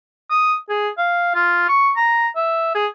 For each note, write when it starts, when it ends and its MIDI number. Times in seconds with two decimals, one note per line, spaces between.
0.30 0.55 87
0.69 0.88 68
0.98 1.33 77
1.35 1.66 65
1.69 1.91 85
1.97 2.28 82
2.36 2.73 76
2.75 2.86 68